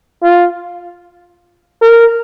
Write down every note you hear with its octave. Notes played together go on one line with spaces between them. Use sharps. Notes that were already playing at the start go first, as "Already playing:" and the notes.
F4
A#4